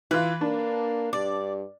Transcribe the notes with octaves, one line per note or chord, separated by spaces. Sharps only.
E3 F4 B4
A#3 D4
G2 D5